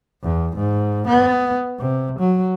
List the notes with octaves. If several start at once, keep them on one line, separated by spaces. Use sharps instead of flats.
E2
G#2
B3
C3
F#3